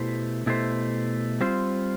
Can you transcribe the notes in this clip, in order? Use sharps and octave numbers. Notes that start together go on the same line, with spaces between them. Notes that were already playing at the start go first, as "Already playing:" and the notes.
Already playing: B2 A3 E4 G4 C5
B2 A3 E4 G4 C5
G3 C4 F4 C5